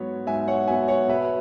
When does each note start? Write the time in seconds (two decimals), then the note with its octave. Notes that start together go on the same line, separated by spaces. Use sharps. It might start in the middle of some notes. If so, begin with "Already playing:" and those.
Already playing: G#2 F#3 B3 C#5
0.27 G#2 E5 G#5
0.48 C#5 F#5
0.68 F#3 B3 E5 G#5
0.88 C#5 F#5
1.08 B2 B4 E5